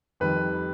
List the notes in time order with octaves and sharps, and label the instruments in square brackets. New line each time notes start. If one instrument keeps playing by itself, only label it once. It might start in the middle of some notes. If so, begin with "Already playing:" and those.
[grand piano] F2 D#3 G3 B4